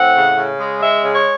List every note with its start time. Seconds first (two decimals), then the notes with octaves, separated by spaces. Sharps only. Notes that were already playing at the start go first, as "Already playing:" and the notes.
Already playing: A2 C4 F#5
0.16 C#3
0.38 C#3
0.60 G#3
0.82 G#3 E5
1.04 C#3
1.15 C#5